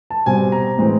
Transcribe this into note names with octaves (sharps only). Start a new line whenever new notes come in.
A5
B2 G3 C4 G#5
A#5
A2 E3 G#3 C4